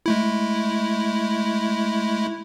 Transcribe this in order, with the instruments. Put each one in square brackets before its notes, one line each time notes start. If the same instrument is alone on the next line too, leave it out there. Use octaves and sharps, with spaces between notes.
[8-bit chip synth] G#3 A3 E4